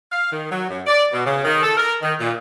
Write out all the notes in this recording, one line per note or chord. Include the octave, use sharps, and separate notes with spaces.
F5
D#3
F#3
F#2
D5
B2
C#3
D#3
A4
A#4
D#3
A#2